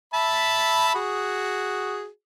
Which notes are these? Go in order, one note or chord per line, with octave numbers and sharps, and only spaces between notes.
E5 A5 B5
F#4 G#4